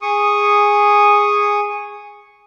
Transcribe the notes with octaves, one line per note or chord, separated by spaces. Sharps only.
G#4 C#6 D#6